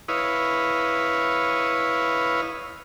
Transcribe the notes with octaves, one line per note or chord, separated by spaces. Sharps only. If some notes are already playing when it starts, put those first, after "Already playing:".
E4 B4 C#5 D#5 F5